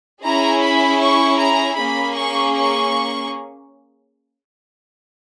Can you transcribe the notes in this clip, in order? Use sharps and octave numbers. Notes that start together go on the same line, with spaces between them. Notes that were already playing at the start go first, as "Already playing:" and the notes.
C#4 E4 G#4 A#5
B5
C#6
A#5
A#3 C#4 G#4 B5
C#6
C#6